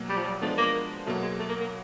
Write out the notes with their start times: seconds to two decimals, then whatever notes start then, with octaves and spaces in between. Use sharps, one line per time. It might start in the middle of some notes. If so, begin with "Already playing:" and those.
Already playing: B2 F#3 A#3
0.09 G3
0.17 F3
0.25 G3
0.42 F3 G#3 A3 B3 D4
0.58 A#3
1.06 B2 F#3 A3 A#3
1.22 G#3
1.39 A3
1.49 A#3
1.60 A#3